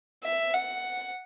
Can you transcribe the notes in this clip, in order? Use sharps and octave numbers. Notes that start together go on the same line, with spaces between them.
E5
F#5